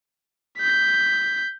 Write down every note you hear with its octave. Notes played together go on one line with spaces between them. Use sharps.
G6 B6